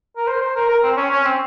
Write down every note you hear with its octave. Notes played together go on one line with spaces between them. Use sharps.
A#4
C5
C5
A#4
A#4
C4
C#4
C#4
C4